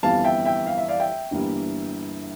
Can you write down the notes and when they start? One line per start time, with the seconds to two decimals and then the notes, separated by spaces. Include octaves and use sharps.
0.03 G1 F2 E3 G3 F5 A5
0.24 E5 G5
0.45 E5 G5
0.67 F5
0.78 E5
0.89 D5 F5
0.99 E5 G5
1.31 G1 G2 E3 G3 A#3